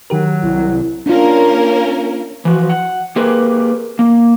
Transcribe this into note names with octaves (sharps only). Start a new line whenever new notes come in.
D#3 F#3 G4 A#4
C2 E4
A#3 C#4 D4 F4 A#4
E3 F3 F#4
F#5
A#3 G4 G#4 A#4 B4
A#3